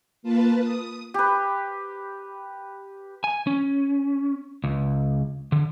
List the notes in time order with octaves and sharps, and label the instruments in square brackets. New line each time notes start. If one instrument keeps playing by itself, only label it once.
[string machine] A#3 F4 B4 A5
D#6
[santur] G4 B4
[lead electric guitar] G#5
C#4
C#2
D3